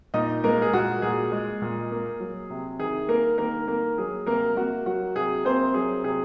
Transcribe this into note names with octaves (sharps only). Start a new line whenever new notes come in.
A#2 D#4 D#5
G#3 A#3 A#4
G#4
A#2 F#4
A#2 G#4
G#3
A#2
A#3
F#3
C3
D#3 G#4
A#3 A#4
D#3 A#3 A#4
A#3 A#4
F#3 G#4
C3 A#3 A#4
A#3 F#4
F#3 F#4
C3 G#4
A#3 C4 C5
F#3 G#4
C3 G#4